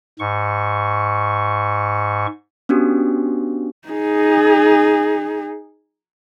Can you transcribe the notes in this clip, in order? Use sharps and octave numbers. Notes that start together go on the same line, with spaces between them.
G#2 C#6
B3 C#4 D4 F#4 G4
D#4 G#4